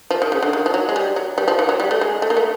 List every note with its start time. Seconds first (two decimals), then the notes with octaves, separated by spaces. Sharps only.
0.11 F3
0.22 D#3
0.32 C#3
0.43 D3
0.53 D#3
0.66 F3
0.74 F#3
0.89 G#3
0.96 G3
1.16 F#3
1.38 G3
1.48 F3
1.59 E3
1.69 F#3
1.80 G3
1.91 A3
2.01 G#3
2.22 A3
2.30 A#3
2.37 A3